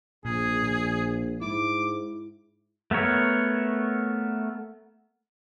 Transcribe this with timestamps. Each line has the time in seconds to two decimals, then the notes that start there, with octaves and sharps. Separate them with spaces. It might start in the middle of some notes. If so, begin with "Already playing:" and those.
0.25 A#1 A#2 G#4
0.63 A#2
1.41 G#2 E4 D6
2.91 A3 B3 A#4 C#5